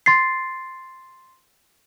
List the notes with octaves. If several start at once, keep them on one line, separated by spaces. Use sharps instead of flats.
C6 A6 C7